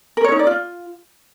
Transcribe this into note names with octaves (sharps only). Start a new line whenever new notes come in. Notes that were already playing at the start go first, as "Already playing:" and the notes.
A#4
C#5
D#4
D5
F4